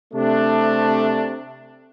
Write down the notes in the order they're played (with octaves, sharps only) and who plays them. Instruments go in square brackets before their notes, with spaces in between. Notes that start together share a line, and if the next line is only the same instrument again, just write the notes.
[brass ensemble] C3 A3 D4